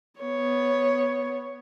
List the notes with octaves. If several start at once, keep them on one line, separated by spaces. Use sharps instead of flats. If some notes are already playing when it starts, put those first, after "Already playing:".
B3 C#5